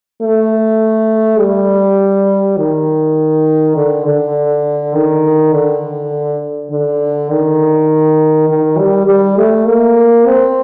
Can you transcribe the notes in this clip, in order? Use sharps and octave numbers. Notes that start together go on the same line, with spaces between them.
A3
G3
D#3
D3
D3
D#3
D3
D3
D#3
D#3
G3
G3
A3
A#3
C4